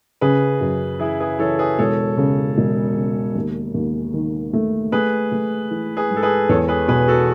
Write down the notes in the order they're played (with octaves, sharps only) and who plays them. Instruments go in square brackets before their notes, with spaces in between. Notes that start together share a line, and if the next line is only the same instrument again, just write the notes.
[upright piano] C#3 [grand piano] G#4 B4
[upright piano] F#2
[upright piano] E3 [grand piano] E4 G#4
[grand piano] G#4 B4
[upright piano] E3 [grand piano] A4 C#5
[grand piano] G#4 B4
[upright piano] E1 [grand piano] A4 C#5
[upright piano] C#3
E1
C#3
D#2
D#2
D#3
A3
[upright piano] A3 [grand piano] G#4 B4
[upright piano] A3
E3
[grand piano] G#4 B4
[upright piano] G#2
[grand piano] A4
G#4 B4
[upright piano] E2 [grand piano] A4 C#5
[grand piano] G#4 B4
[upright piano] B2 [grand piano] G#4 B4
[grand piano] F#4 A4